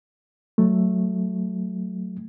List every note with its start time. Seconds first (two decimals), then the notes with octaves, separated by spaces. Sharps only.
0.58 F#3 A3